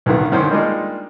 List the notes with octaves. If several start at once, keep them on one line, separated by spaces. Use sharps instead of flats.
B1 D3 D#3 F#3 B3
F#2 D3 D#3 C#4 C5
G3 G#3 A#3 D4 D#4 F4